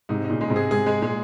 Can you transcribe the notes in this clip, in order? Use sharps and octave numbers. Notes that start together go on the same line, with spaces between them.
G#2 C3 D#4
D#4
A#2 C#3
C#3 G#3
G#2 C3
G#4
G#2 C3 G#4
G#3
A#2 G#3